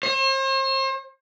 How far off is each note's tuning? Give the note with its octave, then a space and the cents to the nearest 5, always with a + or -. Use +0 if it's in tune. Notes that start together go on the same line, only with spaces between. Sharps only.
C5 +40